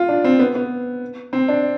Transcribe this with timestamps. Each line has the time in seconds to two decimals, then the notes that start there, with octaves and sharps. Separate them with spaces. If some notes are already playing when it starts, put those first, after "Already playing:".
Already playing: F4
0.09 D4
0.24 C4
0.39 B3
0.55 B3
1.33 C4
1.48 D4